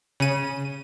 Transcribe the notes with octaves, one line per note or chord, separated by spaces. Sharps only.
C#3 D#7